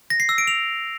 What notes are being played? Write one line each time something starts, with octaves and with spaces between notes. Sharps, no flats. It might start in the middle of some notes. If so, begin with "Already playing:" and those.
A#6
C7
E6
D7
F7